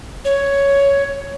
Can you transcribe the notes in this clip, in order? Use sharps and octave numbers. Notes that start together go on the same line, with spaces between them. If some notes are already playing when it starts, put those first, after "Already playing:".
C#5